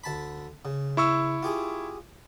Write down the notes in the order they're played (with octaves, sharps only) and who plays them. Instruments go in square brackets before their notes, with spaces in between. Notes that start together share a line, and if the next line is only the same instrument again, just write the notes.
[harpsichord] D2 A5 B5
C#3
[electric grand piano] E4 C#6 E6
[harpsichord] F4 G4 G#4